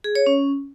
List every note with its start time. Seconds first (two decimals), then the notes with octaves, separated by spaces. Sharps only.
0.04 G#4
0.15 C#5
0.27 C#4